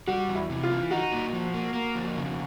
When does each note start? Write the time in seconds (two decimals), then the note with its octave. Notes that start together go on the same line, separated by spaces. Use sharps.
0.07 G3 F#4
0.29 E2
0.35 E4
0.49 C3
0.63 F4
0.70 E3
0.91 D#4 F#4
1.12 A#2
1.33 F3
1.54 A#3
1.74 A#3
1.95 F2
2.16 C#3